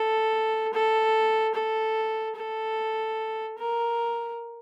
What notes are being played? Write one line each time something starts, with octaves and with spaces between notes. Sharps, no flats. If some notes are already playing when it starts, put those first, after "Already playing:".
Already playing: A4
A4
A4
A4
A#4